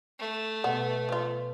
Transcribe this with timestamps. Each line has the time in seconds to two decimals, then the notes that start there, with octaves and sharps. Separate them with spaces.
0.19 A3
0.64 B2 B3
1.09 F3 F4